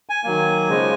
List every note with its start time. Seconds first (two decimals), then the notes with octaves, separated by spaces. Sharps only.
0.09 G#5
0.24 D#3 F#3 A#3
0.69 C#3 F3 G#3